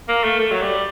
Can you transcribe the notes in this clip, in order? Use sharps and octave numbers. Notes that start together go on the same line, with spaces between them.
A#3
A3
A3
F#3
G3